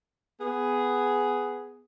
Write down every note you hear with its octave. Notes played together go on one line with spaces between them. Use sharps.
B3 G#4